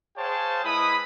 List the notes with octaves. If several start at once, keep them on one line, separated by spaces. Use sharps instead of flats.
G#4 C5 C#5 F5 G5 A5
G#3 E4 B4 B5 D#6